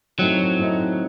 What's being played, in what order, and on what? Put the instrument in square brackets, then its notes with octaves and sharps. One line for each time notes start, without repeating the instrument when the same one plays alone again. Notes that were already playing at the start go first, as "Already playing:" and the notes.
[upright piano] A2 A3 C4 D#4 [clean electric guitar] F#3
[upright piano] A2 A3 C4 D#4